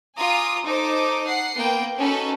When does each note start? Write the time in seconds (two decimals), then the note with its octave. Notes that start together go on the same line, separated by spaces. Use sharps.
0.18 F4 G#5 A#5 D6 D#6
0.64 D#4 A4 C5 D6
1.26 F#5 C7
1.56 A#3 B3 G5
1.97 C#4 D#4 F#4 A4 B4